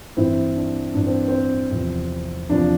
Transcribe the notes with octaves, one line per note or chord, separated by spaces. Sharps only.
G2 E3 C4 E4
D4
G2 E3 D4
C4
C4
E2 C3 F3
E2 C3 F3 D4